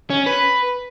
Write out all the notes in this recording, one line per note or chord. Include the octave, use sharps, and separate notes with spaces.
C#4
B4